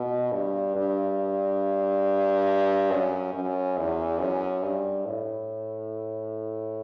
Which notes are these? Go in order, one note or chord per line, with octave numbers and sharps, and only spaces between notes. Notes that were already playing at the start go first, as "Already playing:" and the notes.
Already playing: B2
G2
G2
F#2
F#2
E2
F#2
G2
A2